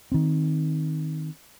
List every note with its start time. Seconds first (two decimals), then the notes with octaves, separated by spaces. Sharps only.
0.12 D#3 C4